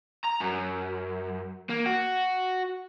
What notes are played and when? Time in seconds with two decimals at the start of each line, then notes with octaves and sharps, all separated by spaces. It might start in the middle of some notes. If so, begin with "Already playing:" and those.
0.25 A#5
0.41 F#2
1.69 A#3
1.86 F#4